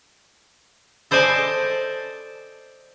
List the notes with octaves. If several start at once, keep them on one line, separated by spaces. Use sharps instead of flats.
A4 C5 D5 D#5 G#5 A5